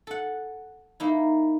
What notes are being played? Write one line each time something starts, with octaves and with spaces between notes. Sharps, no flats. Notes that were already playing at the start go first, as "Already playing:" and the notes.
A4 F#5
A#3 D#4 E4